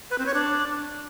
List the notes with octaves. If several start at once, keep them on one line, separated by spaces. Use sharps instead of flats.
B4
C4
C#5
D4